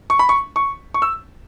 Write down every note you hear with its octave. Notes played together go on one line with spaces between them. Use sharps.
C#6
B5
C#6
C#6
C#6
E6